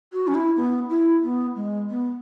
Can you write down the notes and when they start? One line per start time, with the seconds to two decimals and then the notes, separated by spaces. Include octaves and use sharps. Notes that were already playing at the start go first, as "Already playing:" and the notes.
0.13 F#4
0.27 C#4
0.34 E4
0.56 B3
0.89 E4
1.23 B3
1.55 G#3
1.89 B3